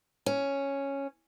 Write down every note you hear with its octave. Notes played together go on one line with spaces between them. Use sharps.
C#4